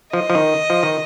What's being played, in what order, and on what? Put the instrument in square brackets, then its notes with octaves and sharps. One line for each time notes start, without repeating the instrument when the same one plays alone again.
[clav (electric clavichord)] F3 [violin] D#5
[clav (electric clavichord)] F3
D#3
F3
D#3